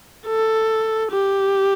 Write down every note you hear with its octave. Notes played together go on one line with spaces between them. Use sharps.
A4
G4